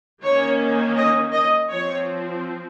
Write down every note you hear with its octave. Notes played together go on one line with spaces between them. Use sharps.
D#3 A#3 C#4 C#5
D#5
D#5
F3 C4 C#5